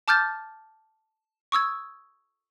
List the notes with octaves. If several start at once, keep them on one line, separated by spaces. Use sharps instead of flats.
A5 D6 F6 G6 A6
C#6 D#6 E6 G#6